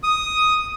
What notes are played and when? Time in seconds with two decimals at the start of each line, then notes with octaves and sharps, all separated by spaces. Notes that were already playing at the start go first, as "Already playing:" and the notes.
0.03 D#6